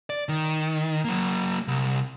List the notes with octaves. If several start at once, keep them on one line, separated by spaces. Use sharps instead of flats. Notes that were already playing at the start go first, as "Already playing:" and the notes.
D5
D#3
F#3 A#3
C2